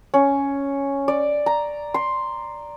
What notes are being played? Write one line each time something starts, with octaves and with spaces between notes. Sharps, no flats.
C#4
D5
A#5
C6